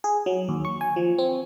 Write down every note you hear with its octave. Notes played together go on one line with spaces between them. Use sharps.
G#4
F#3
D#2
C#6
G#5
F3
C4